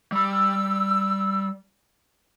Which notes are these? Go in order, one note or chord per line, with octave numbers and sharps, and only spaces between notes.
G3 B5 E6